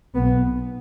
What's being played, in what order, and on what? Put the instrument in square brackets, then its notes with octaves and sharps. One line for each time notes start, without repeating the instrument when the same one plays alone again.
[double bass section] B1 B2 B3